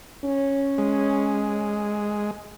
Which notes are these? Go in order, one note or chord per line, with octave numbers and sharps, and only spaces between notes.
C#4
G#3